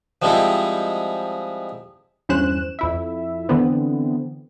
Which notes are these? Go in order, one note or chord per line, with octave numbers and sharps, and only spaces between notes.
F3 G3 G#3 C4 D#4 E4
E2 G2 C#4 C5 F#6 E7
F2 E4 E5
D3 E3 B3 C4